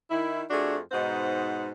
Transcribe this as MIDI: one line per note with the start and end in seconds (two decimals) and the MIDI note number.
0.11 0.43 51
0.11 0.43 64
0.50 0.78 41
0.50 0.78 57
0.50 0.78 62
0.50 0.78 66
0.50 0.78 68
0.92 1.71 44
0.92 1.71 47
0.92 1.71 63
0.92 1.71 72
0.92 1.71 78